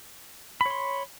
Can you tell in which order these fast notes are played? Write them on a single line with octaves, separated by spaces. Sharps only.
B5 C#5 C6